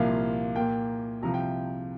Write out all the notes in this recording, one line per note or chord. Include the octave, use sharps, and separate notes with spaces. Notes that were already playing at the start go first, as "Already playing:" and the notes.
Already playing: C2 A#2 F3 A#3 F5
A#2 A#3 G5
C2 C3 F3 A#5
G5